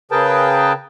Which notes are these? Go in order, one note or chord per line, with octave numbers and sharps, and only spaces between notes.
C#3 G#4 A#4 B4 G5 A5